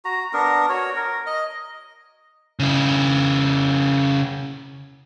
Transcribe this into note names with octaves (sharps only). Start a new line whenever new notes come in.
F#4 A#5
B3 D4 A#4
F#4 C#5
A#4
D#5
C#3 E4